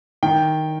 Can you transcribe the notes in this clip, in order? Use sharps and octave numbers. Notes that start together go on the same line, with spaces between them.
D#3 G5